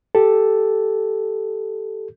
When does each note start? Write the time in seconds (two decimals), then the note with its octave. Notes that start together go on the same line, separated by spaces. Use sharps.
0.15 G4 A4